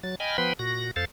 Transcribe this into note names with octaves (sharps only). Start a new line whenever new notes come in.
F#3 A6
D#5 G5 G#5 B5 F6
F3 B3 B4 G5 B5 C6
A#2 F#4 A#6
F2 A4 C5 F5 A6